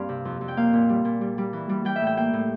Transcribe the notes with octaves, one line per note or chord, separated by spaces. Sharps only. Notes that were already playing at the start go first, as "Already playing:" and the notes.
Already playing: G2 G3 A#3 C4 D5 F5
C3
F2
F2
G5
A#3 F5
A#2
G3
A#2
G3
G3
E3
G3
G3 G5
E5
A2
G5
A#3 G5
A2